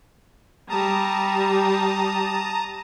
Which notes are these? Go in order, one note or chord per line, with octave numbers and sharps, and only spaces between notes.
G3 A5 A#5 D#6